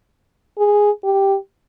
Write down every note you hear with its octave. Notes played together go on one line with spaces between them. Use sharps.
G#4
G4